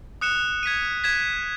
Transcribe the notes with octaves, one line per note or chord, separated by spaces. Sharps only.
D#6 F#6 C#7 E7
G#6 B6 D#7
G#6 B6 E7